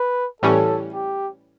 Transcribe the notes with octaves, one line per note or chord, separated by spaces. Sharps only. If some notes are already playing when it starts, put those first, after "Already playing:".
Already playing: B4
A2 E3 G3 C#4 A4
G4